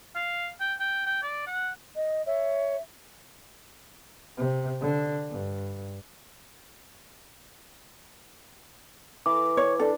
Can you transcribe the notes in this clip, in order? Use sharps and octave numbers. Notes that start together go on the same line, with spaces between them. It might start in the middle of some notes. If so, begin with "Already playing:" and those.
F5
G5
G5
G5
D5
F#5
D#5
C#5 E5
C3
D3
G2
E3 D6
C#5
D4 A4